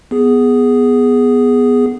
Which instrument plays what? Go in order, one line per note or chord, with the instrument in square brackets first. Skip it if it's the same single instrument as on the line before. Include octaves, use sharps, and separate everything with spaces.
[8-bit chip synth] B3 G#4